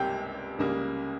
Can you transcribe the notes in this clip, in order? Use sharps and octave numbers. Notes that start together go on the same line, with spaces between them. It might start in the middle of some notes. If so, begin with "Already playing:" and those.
Already playing: C#2 C3 G3 A#3 G5
C#2 C#3 G3 A#3